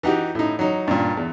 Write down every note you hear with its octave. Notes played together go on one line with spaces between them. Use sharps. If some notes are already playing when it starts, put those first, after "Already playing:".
E3 D#4 F#4 G4
A2 D#4
F#3 D#4
G2 A#2
E2